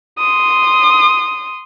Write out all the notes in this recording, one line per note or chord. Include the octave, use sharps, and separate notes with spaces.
C6 D#6